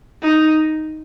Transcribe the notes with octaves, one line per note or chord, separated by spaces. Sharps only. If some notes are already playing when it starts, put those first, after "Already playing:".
D#4